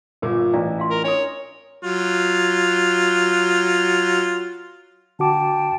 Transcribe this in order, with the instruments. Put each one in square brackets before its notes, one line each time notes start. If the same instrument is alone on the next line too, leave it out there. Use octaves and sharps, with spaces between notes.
[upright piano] G1 A#2 [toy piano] A#4
[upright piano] A1 [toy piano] D5 F5 A#5
[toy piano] F4 F5 C6
[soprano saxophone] A#4
[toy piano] D4 D#6 [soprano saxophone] C#5
[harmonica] F#3 F4
[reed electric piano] D3 F#4 D6 [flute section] G5 A5